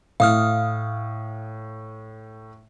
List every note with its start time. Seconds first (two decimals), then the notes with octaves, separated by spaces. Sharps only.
0.20 A2 F5 D#6 F6